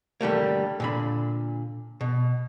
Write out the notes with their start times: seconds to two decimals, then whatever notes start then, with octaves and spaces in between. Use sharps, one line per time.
0.21 D3 G3 A3 A#3
0.80 A#2 D3 B5
2.01 B2